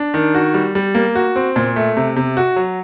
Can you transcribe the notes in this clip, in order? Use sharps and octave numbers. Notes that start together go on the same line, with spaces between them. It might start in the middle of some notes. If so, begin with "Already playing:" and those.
Already playing: D4
D#3
F#4
G3
G3
A#3
F#4
C4
A#2
A3
C3
C3
F#4
F#3